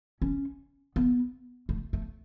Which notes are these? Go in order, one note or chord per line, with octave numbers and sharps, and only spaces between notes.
C#4
B3
A3
A3